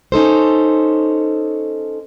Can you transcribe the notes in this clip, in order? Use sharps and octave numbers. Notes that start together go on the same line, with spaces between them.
C#4 D#4 A4 C5